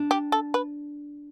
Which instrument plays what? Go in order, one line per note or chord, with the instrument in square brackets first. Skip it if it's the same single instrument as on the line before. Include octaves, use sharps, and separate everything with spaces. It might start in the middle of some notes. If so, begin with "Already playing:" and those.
Already playing: [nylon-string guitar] D4
[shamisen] G4
A4
B4